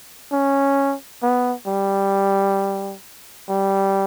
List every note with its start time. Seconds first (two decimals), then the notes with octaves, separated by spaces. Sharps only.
0.32 C#4
1.22 B3
1.67 G3
3.49 G3